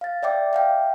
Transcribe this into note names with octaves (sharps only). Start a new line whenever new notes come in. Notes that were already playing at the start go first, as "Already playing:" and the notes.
F5 A6
D5 E5 G5 D6
E5 F5 G5